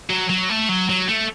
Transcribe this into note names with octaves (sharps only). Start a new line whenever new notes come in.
F#3
F#3
A3
F#3
F#3
A3